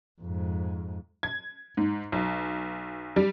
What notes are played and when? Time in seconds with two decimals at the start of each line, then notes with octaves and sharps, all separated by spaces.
0.21 F2 G#2
1.23 G#6
1.77 G#2
2.12 B1
3.16 G3